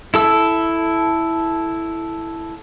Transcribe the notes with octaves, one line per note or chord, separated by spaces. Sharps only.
E4 A4 E6